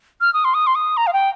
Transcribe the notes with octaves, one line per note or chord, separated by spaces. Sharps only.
F6
D#6
C6
D#6
C6
D#6
A#5
F5
G5